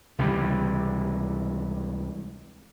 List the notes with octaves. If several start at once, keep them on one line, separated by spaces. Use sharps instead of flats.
C#2 C3 E3 G3